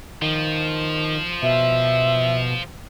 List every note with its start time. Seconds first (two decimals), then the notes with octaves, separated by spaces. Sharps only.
0.22 D#3 F3
1.43 B2 E5